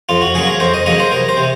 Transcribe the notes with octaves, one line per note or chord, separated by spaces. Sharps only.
F2 F4
F#4
C#3 F#3 A#3 G#4
A#4
F2 C5
D#5
C#3 F#3 A#3 D#5
C5
C2 A#4
C5
C3